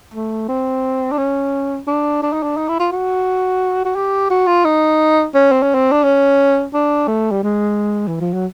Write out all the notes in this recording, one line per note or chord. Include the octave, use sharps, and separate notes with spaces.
A3
C4
D4
C#4
D4
D4
D#4
D4
D#4
E4
F4
F#4
F#4
G4
F#4
F4
D#4
C#4
C4
C#4
C4
D4
C#4
D4
A3
G3
G#3
E3
F3
F#3